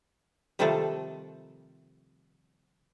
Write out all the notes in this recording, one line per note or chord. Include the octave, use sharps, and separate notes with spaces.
C3 D#3 F3 G3 A3 A4